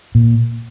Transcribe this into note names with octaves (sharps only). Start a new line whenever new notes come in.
A#2